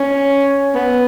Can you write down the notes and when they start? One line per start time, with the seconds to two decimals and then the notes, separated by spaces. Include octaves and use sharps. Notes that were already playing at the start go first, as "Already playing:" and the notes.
Already playing: C#4
0.75 B3